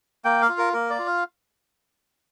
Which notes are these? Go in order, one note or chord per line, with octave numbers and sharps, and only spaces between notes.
A#3 G5
F5
F4
A#4
A#3 A#4
D5
F4
F5